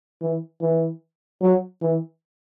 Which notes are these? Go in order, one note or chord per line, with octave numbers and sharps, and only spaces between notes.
E3
E3
F#3
E3